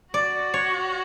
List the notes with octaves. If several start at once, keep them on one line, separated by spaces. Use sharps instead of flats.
F#4 D5
C#5